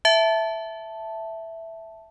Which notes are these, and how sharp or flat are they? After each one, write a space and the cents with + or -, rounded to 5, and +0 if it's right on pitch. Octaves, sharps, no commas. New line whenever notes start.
E5 +0 A5 +0